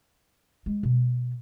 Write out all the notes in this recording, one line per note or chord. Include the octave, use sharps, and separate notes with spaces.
G#3
B2